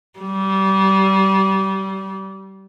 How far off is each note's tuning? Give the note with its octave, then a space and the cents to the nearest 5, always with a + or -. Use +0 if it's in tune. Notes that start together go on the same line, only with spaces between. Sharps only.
G3 -25